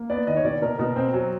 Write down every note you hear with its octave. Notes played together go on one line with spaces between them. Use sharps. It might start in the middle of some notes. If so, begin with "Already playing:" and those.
Already playing: A#3
B3 D5
D#3 D#5
C#5
B2 D5
B2 A#4
B2 A#4
C4
F#3